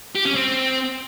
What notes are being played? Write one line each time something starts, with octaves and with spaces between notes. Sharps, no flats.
G4
C#4
C4